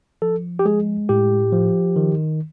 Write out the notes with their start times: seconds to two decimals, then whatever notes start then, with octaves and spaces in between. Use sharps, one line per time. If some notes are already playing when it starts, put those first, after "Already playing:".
0.22 F3 A4
0.59 G4
0.65 G#3 G#4
1.09 A2 G4
1.53 F3
1.96 D#3